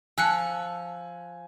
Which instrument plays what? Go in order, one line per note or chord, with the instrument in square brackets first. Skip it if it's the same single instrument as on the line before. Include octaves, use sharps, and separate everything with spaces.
[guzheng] F3 [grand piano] G#5 [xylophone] E6 F#6 C#7